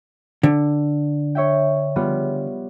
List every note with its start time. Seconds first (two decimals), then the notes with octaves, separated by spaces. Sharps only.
0.43 D3
1.35 C#5 E5 G5
1.96 G3 B3 F4